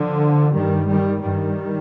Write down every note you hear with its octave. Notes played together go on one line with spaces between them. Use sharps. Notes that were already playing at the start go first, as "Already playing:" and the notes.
Already playing: D3 F3
G2 D#3 G3
D#3 G3
G2 D#3 G3